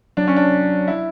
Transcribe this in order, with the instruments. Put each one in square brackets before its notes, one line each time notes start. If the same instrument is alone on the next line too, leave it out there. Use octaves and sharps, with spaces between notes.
[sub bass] F#3 [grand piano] D4
[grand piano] C#4
D4
E4